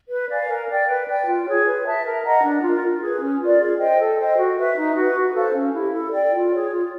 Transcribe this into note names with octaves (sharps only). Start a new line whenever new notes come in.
B4
D5 F5 G#5
A#4
D5 G5
B4
D5 G5
F4
G#4 C#5
B4
E5 A5
A#4
D#5 F#5 A#5
D4
F4 A#4
F4
G#4 B4
C#4
F4 A#4 D5
G#4
C5 D#5 G5
A4
C5 D#5 G5
F#4
B4 E5
D#4
F#4 B4
F#4
A4 C5 F5
C#4
E4 G4
A4
D5 G5
F4
G#4 C#5
F4